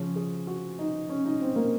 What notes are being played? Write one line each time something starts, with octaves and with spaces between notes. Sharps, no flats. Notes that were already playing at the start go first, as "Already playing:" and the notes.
Already playing: C#3 F3 C#4
G#4
F#4
D#4
C#4
D#4
C4
A#3